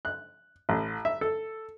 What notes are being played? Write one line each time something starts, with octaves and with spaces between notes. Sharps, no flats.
F#6
A1
E5
A4